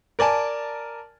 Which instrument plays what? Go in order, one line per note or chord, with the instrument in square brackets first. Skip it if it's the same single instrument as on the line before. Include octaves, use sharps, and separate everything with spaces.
[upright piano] A#4 D5 G#5 A5